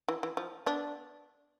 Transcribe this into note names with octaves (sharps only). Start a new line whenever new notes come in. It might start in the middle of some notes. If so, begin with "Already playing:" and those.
E3
E3
F3
B3 D4